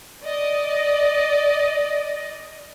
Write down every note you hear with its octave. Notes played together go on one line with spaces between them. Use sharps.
D5 D#5